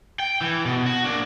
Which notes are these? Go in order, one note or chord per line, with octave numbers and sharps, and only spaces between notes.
G5
E3
B2
F#4
A#3 D4